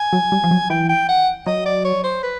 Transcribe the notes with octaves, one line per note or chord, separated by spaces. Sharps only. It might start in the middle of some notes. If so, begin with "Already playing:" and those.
Already playing: G#5
F#3
G3
F3
F#3
E3 G5
G5
F#5
F#3 D#5
D5
C#5
C5
B4